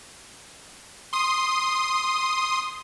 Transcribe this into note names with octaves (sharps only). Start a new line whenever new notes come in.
C6 D#6